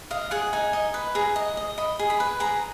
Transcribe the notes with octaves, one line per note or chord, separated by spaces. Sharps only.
D#5 F5
G#4 F#5
D#4 G#5
D#5
B4
G#4 A#5
D#5
D#5
D#5 B5
G#4
B5
B4
G#4 A#5